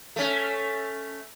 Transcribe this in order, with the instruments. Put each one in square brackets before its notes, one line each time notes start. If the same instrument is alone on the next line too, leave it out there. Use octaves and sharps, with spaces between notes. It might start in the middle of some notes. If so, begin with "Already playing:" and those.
[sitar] A3 C#4